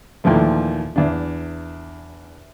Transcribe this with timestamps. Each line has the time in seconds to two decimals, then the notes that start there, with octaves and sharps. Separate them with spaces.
0.24 D#2 A#2 E3 F3 A3
0.96 E2 D4